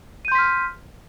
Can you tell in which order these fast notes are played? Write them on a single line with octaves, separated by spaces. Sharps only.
D#7 G6 C6 B6 F6